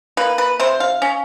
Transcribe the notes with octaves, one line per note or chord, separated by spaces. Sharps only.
A#3 B4
B4
C3 C5
F5
C#4